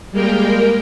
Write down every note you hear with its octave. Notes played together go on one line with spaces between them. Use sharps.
G3 G#3 A#3 A#4 G5